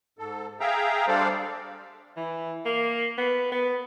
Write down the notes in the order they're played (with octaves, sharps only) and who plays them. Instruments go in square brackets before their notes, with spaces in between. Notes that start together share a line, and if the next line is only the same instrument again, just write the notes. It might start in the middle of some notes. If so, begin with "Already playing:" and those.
[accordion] G#2 A4
G#4 E5 F5 G5 A#5
G3 D4 A4 C5 D5 F5
[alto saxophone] E3
A#3
B3
B3